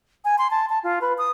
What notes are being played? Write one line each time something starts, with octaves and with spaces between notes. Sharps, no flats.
G#5
C6
A5
A5
F4
B4
D#6